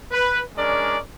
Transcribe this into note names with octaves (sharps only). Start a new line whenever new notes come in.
B4
G#3 C#4 D4 A#4 D5